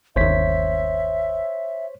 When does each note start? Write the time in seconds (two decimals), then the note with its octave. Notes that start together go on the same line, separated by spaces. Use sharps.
0.16 G1 D#2 C5 C#5 E5 B6